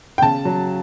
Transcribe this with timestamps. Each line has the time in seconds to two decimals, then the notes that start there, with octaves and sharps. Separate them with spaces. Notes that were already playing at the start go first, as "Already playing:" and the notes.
0.18 G5
0.22 C#3 A5
0.45 F#3